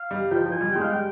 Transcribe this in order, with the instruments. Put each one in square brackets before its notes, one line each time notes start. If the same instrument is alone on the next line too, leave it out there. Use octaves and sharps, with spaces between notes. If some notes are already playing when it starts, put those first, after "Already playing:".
Already playing: [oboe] F5
[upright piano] G3
[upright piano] F3 [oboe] G5
[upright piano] F3
[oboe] G#5
[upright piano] G3
[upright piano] G#3 [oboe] G5
[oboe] F5
[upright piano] G3 [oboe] G5